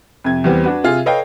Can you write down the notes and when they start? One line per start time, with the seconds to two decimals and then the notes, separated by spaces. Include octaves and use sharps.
0.24 F2 C3 G#6
0.44 E2 G3 B3 C4
0.64 D4 F#4 B4
0.84 C3 F4 G#4
1.06 A4 B4 C#5 D#5 F5 G5